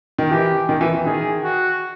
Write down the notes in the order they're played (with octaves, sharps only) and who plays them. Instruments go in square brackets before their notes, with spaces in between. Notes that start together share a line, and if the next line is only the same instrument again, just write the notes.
[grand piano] D#3
[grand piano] E3 [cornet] G4
[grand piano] D#3
E3
E3
[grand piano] D#3 [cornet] G#4
[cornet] F#4